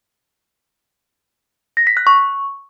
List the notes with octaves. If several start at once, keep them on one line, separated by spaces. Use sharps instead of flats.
A#6
B6
F#6
C#6